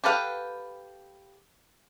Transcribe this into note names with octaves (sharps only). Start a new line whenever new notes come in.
G4 A4 B4 F5 F#5